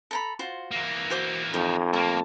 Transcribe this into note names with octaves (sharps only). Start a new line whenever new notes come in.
A4 A#5 B5
F4 F#4 C5
E3 A#3
F#4 C5 D6
F2 D#4 D#5
A3 A#3 A5